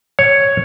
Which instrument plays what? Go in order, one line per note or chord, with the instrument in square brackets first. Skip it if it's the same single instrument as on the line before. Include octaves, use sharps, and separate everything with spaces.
[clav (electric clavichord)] C#5